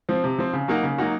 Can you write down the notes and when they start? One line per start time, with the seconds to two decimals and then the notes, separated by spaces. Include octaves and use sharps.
0.09 F3 C4
0.24 C3
0.38 F3 C4
0.53 C#3
0.68 F#3 A#3 D#4 F#4
0.83 C#3
0.98 F#3 A#3 D#4 F#4